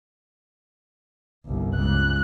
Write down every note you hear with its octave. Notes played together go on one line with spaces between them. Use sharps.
G1 C2
C#2 F#6